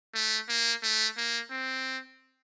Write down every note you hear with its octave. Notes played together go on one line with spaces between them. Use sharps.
A3
A#3
A3
A#3
C4